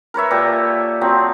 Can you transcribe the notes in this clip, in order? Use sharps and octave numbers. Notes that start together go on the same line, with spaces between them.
A#4 B4 C#5 E5
A#2 G4 A4
F3 F#3 C4